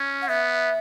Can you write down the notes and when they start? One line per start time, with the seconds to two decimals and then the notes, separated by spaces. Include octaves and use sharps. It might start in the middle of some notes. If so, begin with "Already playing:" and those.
Already playing: C#4
0.22 F#5
0.28 B3 E5